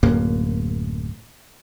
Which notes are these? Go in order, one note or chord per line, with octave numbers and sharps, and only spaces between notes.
D1 F#2 A#3